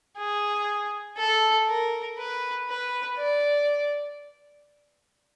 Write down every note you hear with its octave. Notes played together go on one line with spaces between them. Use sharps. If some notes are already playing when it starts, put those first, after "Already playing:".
G#4
A4
A#4
B4
B4
D5